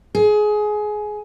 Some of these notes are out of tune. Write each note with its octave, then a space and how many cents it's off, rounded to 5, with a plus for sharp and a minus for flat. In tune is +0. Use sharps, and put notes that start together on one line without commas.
G#4 +20